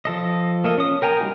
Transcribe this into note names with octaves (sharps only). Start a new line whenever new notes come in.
F3 A4 D#5
A#3 A4 D#5
C#4 D#6
A#4 G5 G#5 A#5
G3 A#3 D#4 F#4